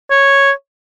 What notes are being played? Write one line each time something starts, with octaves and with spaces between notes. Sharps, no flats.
C#5